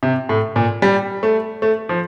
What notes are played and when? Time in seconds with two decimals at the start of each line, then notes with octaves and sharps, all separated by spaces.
0.03 C3
0.29 A2
0.56 A#2
0.82 G3
1.23 A3
1.62 A3
1.89 F3